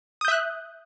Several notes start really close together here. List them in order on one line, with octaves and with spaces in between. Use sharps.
D#6 G6 E5 F#6